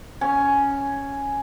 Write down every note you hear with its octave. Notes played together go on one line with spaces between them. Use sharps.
C#4